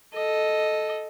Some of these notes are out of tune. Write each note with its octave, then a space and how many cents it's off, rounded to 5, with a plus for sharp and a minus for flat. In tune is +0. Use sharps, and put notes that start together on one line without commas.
A4 -10 D#5 +0